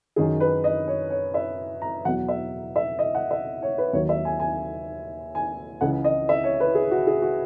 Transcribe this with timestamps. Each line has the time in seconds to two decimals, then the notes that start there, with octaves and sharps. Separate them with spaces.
0.16 F#2 D#3 F#3 G#4
0.40 B4
0.64 D#5
0.88 C#5
1.10 C#5
1.34 E5
1.82 A#5
2.05 E2 B2 F#3 F#5
2.28 E5
2.76 E5
2.99 D#5
3.15 F#5
3.31 E5
3.62 C#5
3.78 B4
3.93 D#2 D#3 F#3 C#5
4.09 E5
4.25 G#5
4.40 G#5
5.35 G#5
5.81 C#2 C#3 E3 F#5
6.05 D#5
6.29 E5
6.44 C#5
6.60 B4
6.75 G#4
6.91 F#4
7.07 G#4
7.22 F#4